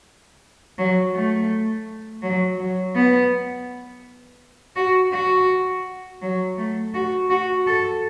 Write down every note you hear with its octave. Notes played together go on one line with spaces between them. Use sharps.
F#3
A3
F#3
F#3
B3
F#4
F#4
F#3
A3
F#4
F#4
A4